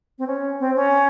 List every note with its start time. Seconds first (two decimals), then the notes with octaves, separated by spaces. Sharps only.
0.19 C4
0.27 C#4
0.60 C4
0.76 C#4